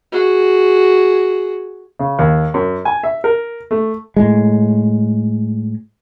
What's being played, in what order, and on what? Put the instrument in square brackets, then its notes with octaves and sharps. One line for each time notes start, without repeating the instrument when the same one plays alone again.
[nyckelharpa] F#4 G#4
[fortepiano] C#3
D#2
F#2
G#5
E5
A#4
A3
[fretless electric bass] A2 G#3